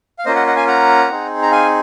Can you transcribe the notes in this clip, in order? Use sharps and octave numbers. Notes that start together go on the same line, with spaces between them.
F5
A#3 C#4 F4 C5 D#5
D#5 F#5
D#5 F#5
F5 G#5
F#5 A#5
C4 D#4 G#4
A#5
F5 G#5